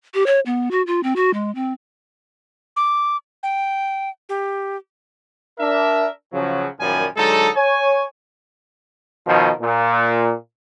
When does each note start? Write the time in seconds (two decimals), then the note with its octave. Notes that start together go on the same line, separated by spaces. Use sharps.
0.14 G4
0.26 C#5
0.46 B3
0.71 F#4
0.87 F4
1.03 C4
1.16 F#4
1.34 G#3
1.55 C4
2.76 D6
3.43 G5
4.29 G4
5.59 D4 A#4 E5
6.33 C#3 F3 F#3
6.79 F#2 A#2 D#3 F3 G3 G#5
7.16 D3 F#3 G#3 D#4 A4
7.55 C#5 G#5
9.27 B2 D#3 F3
9.61 A#2